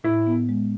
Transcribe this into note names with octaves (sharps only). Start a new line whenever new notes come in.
A2 E4
B3
G#3